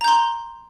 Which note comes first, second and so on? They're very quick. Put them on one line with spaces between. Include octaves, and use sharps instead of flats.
A#5 G6 C6